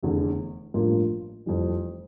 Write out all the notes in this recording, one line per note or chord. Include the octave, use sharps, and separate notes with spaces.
F1 E2 D3
A1 G2 F3 A#3 F4
F1 F2 E3 G3